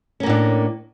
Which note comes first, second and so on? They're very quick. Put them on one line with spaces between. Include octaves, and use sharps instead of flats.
C#4 A#3 A2 D4